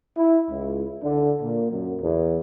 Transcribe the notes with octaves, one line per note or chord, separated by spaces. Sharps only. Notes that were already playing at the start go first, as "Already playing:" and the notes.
E4
C#2
D3
A#2
F#2
E2